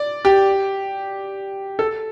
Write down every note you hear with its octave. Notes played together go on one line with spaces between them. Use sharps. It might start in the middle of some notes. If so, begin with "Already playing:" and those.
Already playing: D5
G4
A4